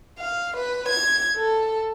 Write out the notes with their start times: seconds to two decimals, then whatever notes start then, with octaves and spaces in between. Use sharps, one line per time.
0.19 F5
0.56 B4
0.88 G#6
1.36 A4